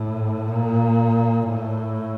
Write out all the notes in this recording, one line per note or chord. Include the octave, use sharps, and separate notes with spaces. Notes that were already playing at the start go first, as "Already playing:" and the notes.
Already playing: A2
A#2
A2